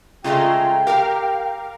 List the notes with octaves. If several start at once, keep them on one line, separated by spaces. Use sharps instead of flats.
C#3 G#3 A3 F4 G5 A#5 C6
G4 A#4 F5